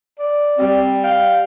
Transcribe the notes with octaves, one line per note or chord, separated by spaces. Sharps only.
D5
G3 C4
F5 G5